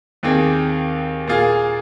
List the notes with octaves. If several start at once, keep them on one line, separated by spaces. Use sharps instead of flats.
D#2 D#3 C4 G#4
A#2 A#3 F4 G#4